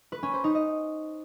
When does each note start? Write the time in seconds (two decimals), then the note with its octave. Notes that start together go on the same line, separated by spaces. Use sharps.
0.12 B4
0.23 C#4
0.33 C5
0.44 D#4
0.55 D#5